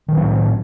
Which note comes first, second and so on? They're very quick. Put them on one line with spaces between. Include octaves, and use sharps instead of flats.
D#3 F#3 C4 A2